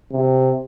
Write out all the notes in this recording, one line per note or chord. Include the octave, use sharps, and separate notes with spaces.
C3